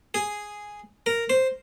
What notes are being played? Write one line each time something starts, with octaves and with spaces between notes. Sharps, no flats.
G#4
A#4
C5